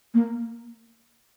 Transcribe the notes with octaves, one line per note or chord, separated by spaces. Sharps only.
A#3